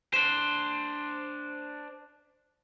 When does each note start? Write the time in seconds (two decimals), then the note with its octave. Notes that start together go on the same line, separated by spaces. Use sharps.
0.14 D4 C5